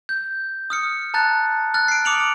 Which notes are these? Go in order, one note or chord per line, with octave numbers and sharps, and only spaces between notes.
G6
D#6 F6 C#7
A5 A#5 F#6 A6
F6 F#6 A6
C7 D7
D6 D#6 C#7 D7 F7 F#7